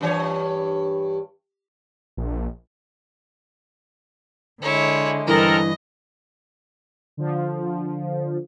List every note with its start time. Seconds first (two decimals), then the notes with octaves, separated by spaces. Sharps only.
0.01 G2 E3 C#5
2.17 A#1
4.62 D3 G#3 E4 C#5
5.27 G2 E3 C4 A4 A#4 D#5
7.17 D3 F3